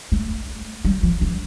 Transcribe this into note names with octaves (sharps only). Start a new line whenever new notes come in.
A3
G3
F3
E3